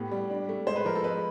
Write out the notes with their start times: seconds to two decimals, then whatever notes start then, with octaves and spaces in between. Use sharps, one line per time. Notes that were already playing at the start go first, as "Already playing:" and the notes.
Already playing: A2 B3 G4
0.11 G3
0.30 D4
0.49 A3
0.66 G#3 C5
0.76 B4
0.85 F3 A#4
0.95 A4
1.04 G#3 B4